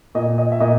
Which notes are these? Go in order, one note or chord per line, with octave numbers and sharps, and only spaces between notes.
A#2 D#5
D#5
E5
A#2 D#5